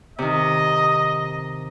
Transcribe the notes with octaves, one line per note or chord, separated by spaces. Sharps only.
C3 D#3 D#5